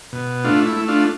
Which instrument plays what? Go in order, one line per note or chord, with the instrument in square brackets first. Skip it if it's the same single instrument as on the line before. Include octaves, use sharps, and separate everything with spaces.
[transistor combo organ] B2
A3 D4 F4
E4
A3
D4 F4